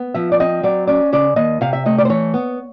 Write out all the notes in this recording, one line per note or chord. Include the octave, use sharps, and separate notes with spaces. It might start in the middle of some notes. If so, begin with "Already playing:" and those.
Already playing: B3
F3 E5
D5
C4 D#5
F#3 D5
C#4 D5
C#3 D5
D#2 D#5
C3 F5
E5
A3 D#5
D5
C5
E3 C#5
B3